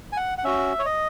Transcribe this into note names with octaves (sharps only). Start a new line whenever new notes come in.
G#5
F#5
F#5
C#4 F#4 E5
C#5
D#5